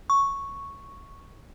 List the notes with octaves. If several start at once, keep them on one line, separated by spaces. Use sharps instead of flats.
C#6